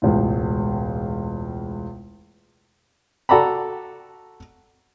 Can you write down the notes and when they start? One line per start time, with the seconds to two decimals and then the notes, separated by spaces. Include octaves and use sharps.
0.02 E1 C#2 A2
3.29 F#4 A4 D5 A#5 B5